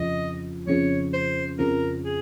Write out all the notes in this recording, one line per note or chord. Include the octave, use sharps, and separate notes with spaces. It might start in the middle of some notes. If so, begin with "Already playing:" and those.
Already playing: F2 C#3 F3 D#5
F2 C#3 F3 C#5
C5
F2 C#3 F3 A#4
G#4